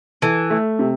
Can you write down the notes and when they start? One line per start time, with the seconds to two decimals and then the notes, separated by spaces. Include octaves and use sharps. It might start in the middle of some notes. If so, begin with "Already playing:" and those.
0.22 E3 A4
0.50 A3
0.79 C3